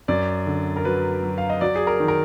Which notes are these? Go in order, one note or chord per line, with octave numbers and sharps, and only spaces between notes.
F#2 D5
D3
A#4
F#3 B4
F#3
F5
D#5
F#3 D5
G#4
A#4
D#3
A#4